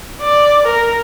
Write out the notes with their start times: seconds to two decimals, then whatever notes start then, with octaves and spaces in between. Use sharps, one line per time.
0.21 D5
0.65 A#4